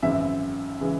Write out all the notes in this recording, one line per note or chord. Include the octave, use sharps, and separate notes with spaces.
G#1 F#2 C#3 E3 G#3 E5
C#3 E3 G#3